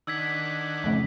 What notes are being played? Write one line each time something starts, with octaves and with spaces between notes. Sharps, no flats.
D#3 D4 F#5 E6 G#6 B6
F2 A2 C#3